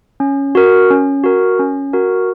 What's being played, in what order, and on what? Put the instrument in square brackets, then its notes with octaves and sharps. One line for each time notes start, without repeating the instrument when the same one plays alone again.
[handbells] C#4
F#4 A#4
C#4
F#4 A#4
C#4
F#4 A#4